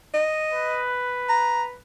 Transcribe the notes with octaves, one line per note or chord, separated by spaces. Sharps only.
D#5
B4
A#5